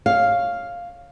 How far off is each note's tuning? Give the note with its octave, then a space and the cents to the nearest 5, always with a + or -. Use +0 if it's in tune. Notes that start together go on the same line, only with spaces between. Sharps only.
C#5 +0 F5 +0